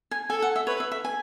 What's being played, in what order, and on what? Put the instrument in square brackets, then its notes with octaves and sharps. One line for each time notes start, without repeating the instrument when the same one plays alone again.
[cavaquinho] G#5
[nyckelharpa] A4 [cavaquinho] G#5
[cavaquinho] F#5
E5
[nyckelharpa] B4 [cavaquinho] C#5
[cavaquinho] E5
E5
G#5